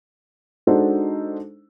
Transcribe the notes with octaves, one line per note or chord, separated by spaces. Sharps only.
G#3 D4 D#4 F#4 A4 C5